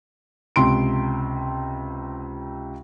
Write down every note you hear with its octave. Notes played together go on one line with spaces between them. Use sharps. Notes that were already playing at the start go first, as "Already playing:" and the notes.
C#2 C3 C6 D7